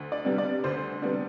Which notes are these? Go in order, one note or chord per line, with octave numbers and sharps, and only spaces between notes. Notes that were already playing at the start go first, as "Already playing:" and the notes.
Already playing: D2
D5
C3 G3 B3 D4
D5
D2 C5
C3 G3 B3 D4